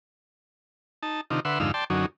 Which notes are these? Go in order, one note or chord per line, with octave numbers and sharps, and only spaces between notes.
D#4 A5
C3 D#3 D4 D#4 F4
D3 B4 E5 F#5 C6
F2 G#2 D3 D#4 F5 E6
D5 G5 A5 C6
F#2 D3 F#3 C#4 D#4